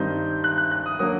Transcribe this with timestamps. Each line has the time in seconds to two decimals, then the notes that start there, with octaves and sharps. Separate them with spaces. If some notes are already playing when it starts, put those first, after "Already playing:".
Already playing: G2 D#3 G3 C4 D#4 G6
0.44 F#6
0.58 F#6
0.71 F#6
0.86 D#6
0.99 D3 F#3 A#3 D#6